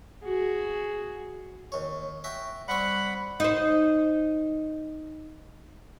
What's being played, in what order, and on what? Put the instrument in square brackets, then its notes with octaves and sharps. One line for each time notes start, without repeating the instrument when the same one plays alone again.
[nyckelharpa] F#4 G#4
[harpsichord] D#2 C#5
F#4 E5 G5
[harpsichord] G3 C4 C#6 [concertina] F#5 B5
[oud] D#4 C5